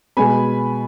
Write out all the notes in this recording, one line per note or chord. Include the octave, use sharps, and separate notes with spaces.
B2 G#3 B3 G#5 B5